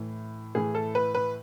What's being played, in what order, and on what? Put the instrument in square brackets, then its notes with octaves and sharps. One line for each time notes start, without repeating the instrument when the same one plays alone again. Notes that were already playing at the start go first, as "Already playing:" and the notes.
Already playing: [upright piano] A2 E3
A2 E3 G#4
A4
B4
B4